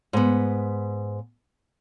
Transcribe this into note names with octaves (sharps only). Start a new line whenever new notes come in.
G#2 B3